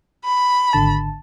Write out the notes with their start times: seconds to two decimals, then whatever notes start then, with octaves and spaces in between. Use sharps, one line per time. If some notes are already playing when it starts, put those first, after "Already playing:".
0.25 B5
0.73 G#1 D3 A5